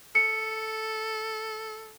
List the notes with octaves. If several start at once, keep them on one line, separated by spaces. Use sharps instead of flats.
A4 C#7